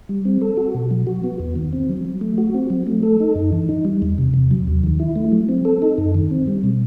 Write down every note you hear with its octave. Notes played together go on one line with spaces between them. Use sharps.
G3
C4
A4
F#4
B2
F#3
F#4
B3
E2
D#3
C4
F#3
F#3
A3
F#4
C4
F#3
A3
A4
D#4
F#2
E3
D#4
G3
E2
C3
E2
F#3
D#2
D#3
E4
A3
F#3
C4
A4
D#4
F#2
D#3
C4
G3
B2